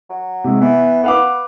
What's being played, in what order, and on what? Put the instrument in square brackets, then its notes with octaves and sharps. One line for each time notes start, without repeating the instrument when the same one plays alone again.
[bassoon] F#3
[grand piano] C3 G#3
[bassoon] E3 [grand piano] B3
[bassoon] B3 [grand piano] B4 F5 D6